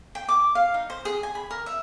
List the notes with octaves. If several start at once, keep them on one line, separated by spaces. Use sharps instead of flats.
G5
D6
F5
D#4
C5
G#4
G#5
B5
A#4
E5